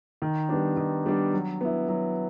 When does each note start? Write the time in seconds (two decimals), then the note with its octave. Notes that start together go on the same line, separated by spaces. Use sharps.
0.22 D#3
0.49 G3 B3 D4
0.77 D#3
1.06 G3 B3 D4
1.33 F#3
1.61 B3 E4
1.89 F#3